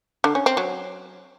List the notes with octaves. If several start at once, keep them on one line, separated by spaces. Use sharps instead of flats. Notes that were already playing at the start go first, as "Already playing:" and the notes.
D3
C#4
C4
F#3